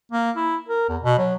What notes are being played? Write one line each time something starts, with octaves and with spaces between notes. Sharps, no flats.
A#3
E4
A#4
E2
B2
F#3